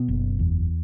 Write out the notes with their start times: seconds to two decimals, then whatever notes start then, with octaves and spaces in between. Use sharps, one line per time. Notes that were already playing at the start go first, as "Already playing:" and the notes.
Already playing: B2 B3
0.08 F#1
0.39 E2